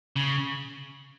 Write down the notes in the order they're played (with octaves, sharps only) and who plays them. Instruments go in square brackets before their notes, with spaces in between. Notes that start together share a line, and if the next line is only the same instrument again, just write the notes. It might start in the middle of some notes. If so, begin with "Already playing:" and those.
[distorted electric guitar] C#3